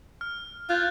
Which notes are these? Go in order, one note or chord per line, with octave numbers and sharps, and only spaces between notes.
F6
F4 F#6 G6 A6